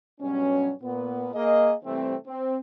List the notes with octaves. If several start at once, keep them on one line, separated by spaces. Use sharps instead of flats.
G2 B2 F#3 G3 C#4
A#2 B3
A#3 G#4 D#5
C3 E3 G3 A3 C4
C4